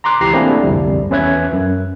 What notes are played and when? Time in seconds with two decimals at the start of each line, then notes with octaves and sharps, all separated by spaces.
0.04 A#5 C6 D6 F#6
0.21 C#2 E3 G4 A#5 C7
0.33 A3 A#3 C4 D4 E4 G#4
0.63 G1 C2 F2 G3
1.10 E2 C#4 B4 E5 F#6 G#6
1.53 F#2